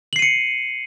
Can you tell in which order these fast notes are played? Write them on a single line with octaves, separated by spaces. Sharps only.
F#7 C7 D#7 C#7